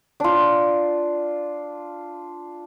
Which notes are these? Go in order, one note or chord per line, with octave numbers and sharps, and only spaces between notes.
D4 F4